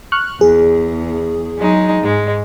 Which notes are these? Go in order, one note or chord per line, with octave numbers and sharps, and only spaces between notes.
C#6 F6 F#6
E2 G#4
F#3 G#3 D#4
G#2 G#3